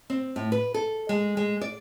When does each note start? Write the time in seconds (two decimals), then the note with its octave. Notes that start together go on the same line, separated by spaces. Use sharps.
0.10 C4
0.36 A2
0.52 B4
0.74 A4
1.09 G#3
1.37 G#3
1.61 D5